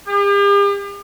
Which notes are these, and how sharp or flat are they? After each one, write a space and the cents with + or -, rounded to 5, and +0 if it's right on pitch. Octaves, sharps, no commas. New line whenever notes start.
G4 +45